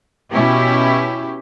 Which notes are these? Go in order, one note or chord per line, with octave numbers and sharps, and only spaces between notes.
B2 C#4 E4 G4